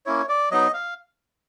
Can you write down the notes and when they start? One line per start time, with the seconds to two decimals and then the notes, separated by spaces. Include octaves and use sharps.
0.06 A#3 C#4 E4 C#5
0.29 D5
0.51 F#3 B3 D#4 D#5
0.74 F5